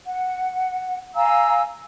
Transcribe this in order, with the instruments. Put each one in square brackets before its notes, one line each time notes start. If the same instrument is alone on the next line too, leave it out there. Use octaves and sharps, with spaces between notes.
[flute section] F#5
F5 G#5 A#5 E6